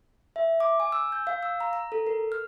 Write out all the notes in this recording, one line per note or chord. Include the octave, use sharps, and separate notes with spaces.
E5
D6
G#5
E6
G6
F5
E6
A#5
A#5
A4
A#4
F6